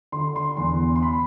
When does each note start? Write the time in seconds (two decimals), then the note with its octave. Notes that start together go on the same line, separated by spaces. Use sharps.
0.12 D3 C6
0.36 C6
0.57 E2 C6
0.96 C6
1.03 B5